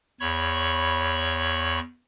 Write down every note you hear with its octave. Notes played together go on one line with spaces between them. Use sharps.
E2 C#5 B5 C#6